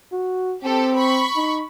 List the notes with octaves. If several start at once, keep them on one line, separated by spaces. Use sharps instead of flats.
F#4
C4 G4 A4
B5 C#6
D#4